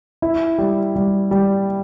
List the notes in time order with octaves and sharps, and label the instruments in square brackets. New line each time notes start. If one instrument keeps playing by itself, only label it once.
[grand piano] E4
G3
G3
G3